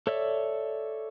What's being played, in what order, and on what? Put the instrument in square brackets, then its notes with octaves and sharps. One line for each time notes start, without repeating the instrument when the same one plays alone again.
[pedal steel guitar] A4 C#5 D5 E5 E6